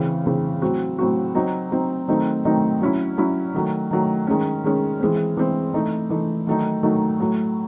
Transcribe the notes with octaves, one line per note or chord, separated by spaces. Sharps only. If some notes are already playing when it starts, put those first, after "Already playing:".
Already playing: C#3 E3 C4
C#3 E3 C4
A2 F#3 C4 F#4
A2 F#3 C4 F#4
F#3 C4 D#4
F#3 C4 D#4
D#3 F#3 A3 C4 D#4
D#3 F#3 A3 C4 D#4
F#3 C#4 E4
F#3 C#4 E4
D#3 F#3 A3
D#3 F#3 A3
D#3 G#3 C#4
D#3 G#3 C#4
E3 G#3 C4
E3 G#3 C4
E3 A3 D#4
E3 A3 D#4
D#3 F#3 A3 D#4
D#3 F#3 A3 D#4
A2 F#3 A3